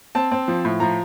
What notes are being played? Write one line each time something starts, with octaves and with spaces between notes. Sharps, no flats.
C4 A5
C4
F3
A2
F3 A#5